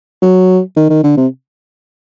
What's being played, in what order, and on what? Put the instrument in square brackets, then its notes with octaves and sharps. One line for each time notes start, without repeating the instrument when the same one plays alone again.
[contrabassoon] F#3
D#3
D#3
D3
C3